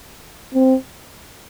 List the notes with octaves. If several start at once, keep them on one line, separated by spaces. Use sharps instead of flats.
C4